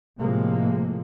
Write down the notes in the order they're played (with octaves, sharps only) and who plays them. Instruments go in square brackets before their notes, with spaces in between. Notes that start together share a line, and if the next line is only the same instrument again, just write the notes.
[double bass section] A2 C3 F3 G#3 A#3